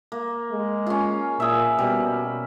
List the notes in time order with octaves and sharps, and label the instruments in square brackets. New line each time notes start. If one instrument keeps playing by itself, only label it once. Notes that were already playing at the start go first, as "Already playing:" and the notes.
[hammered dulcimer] A#3
[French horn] G#3
[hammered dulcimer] C#4 F4
[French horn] A#2 [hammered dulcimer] G#4 E5
[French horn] B2 [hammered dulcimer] G3